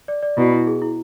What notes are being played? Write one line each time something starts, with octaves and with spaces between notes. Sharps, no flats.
D5
D5
B2 E4
E4
G#4
E4